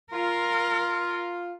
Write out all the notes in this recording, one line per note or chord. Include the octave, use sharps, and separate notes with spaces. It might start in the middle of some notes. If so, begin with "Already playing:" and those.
F4 A#4